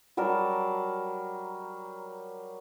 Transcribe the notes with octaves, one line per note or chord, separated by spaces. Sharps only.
F#3 G3 A#4 A5